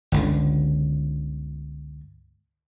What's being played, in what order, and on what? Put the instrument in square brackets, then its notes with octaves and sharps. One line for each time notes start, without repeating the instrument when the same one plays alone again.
[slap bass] G1 C#2 D3